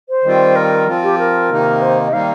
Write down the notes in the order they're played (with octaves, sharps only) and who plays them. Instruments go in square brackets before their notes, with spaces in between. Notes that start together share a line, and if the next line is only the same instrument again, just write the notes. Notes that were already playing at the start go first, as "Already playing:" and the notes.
[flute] C5
[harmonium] D#3 G3 C4 F4
[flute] A#4
[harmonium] F3 C4 F4
[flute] G4
A#4
[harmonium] C3 D#3 A#3 D#4
[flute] C5
D#5
[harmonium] D#3 G3 A#3 D#4 [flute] F5